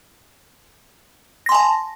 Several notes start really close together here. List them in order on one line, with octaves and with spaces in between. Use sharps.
A#6 C6 G#5 A5